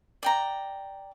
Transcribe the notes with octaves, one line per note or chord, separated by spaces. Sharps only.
D5 G5 A#5